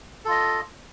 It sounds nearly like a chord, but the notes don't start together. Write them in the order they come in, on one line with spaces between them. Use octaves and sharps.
A4 F4 D#5